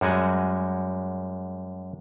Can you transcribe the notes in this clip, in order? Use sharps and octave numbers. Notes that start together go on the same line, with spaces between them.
F#2 G3 G#3 F#4 G#5